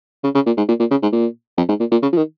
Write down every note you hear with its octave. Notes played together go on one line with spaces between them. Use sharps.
C#3
C#3
A#2
G#2
A#2
A#2
C#3
G#2
A#2
F2
G#2
A#2
A#2
C#3
F3
D#3